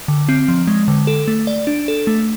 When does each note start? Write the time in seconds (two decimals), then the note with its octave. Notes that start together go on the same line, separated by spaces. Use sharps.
0.08 D3
0.29 C4
0.48 F3
0.67 G#3
0.88 D3
1.07 A4
1.28 A3
1.47 D5
1.67 D4
1.88 A4
2.07 A3